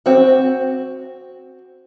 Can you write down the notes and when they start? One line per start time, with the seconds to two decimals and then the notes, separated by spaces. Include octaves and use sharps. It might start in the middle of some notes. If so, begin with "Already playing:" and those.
0.06 C4 F#4